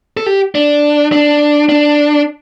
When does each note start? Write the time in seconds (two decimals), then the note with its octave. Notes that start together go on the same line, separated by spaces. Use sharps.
0.17 A4
0.26 G4
0.55 D4
1.12 D4
1.69 D4